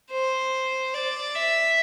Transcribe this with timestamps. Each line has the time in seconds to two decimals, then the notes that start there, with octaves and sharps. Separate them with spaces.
0.11 C5
0.94 D5
1.35 E5